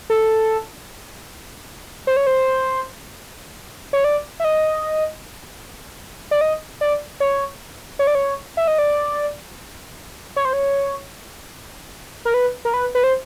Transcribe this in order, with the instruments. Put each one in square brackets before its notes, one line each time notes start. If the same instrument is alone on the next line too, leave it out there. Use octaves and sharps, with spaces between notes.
[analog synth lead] A4
C5
C#5
C5
C#5
D5
E5
D#5
D5
D#5
D5
C#5
C#5
D5
C#5
E5
D#5
D5
C#5
C5
C#5
A#4
B4
A#4
B4
B4
C5